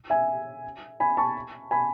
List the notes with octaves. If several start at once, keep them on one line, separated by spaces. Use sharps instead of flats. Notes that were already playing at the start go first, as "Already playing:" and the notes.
E5 G#5
G#5 B5
A5 C#6
G#5 B5